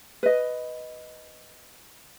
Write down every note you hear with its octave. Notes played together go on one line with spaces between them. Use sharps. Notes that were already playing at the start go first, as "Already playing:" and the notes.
B4 D#5